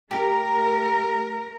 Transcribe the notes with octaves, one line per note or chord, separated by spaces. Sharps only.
A3 G4 A#4